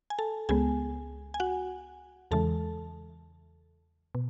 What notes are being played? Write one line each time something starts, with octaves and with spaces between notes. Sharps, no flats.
G#5
A4 A5
C#2 C#3 G#3 B3 G#4 G#5
G#5
F#4 F#5
E2 C#3 E3 G#3 A4 A5
B2